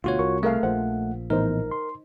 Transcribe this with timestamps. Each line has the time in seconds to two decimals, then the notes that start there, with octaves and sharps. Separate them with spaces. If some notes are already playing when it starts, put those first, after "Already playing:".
0.04 D2 B2 F4 F#4 C#5
0.19 C2 A#4 C#6
0.43 A3 G#4 A#4 F5
0.63 A#1 F3 C5 F#5
1.30 A2 E3 B3 D#4 A#4 C5
1.71 C6